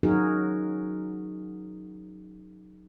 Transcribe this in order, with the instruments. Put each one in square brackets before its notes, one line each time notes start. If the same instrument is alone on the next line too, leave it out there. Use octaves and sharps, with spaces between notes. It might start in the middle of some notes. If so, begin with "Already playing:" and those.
[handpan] F#3 C#4 D#4 F#4 G#4 A#4